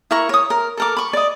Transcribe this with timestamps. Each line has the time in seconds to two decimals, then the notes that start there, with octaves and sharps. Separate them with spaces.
0.11 E4 A#4 C#6
0.29 C#5 D#6
0.50 A#4
0.77 A4 A#4 D6
0.97 B5 C#6
1.13 D5 D#5